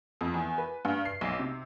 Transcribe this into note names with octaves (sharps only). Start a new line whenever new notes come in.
F2
E2
B4
G2
C7
B1
C3